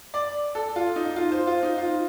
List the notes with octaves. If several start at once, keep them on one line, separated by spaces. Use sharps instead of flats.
D5
A4
F4
D#4
F4
C5
F4
D#4
F4